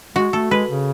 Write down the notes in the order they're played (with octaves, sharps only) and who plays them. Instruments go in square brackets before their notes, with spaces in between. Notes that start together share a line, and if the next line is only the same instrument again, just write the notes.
[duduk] G#3 [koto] F#4
[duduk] A3 [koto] A4
[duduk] G#3 [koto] B4
[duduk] C#3